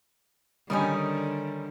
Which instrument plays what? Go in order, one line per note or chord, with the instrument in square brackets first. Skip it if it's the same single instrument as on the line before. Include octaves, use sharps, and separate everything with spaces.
[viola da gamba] D3 [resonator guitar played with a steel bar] D#3 C#4 D#4 [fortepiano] G3 G#5 B5